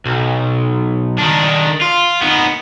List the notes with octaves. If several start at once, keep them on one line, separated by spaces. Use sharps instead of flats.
B1
D#3 D4
F4
D#3 B3